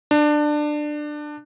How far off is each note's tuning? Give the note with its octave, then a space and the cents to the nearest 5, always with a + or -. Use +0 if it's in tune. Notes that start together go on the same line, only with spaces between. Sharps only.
D4 +20